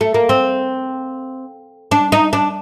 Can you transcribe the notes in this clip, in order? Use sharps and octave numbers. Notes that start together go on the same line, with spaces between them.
A3
A#3
C4
D4
D#4
D4